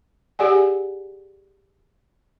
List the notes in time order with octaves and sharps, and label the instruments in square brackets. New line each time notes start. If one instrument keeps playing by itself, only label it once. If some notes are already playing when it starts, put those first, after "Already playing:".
[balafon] G4 G#4 D5 F#5 G#5